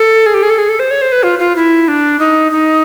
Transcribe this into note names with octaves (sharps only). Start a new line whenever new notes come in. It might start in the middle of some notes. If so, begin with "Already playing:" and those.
Already playing: A4
G#4
G4
G#4
A4
G#4
A4
C5
C#5
C5
B4
F4
F4
E4
D4
D#4
D#4